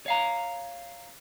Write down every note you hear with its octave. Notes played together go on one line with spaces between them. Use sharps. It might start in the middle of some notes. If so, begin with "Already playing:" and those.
C#5 F5 A#5